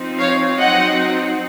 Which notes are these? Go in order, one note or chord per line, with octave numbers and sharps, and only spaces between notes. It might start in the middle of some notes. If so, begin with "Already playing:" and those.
Already playing: F3 C4 D#4
C#5 F5
F#3 C4 D#4 D#5 F#5